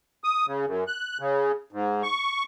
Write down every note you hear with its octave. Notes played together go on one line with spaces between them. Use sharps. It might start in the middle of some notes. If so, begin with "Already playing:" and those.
D#6
C#3
F#2
F#6
C#3
G#2
C#6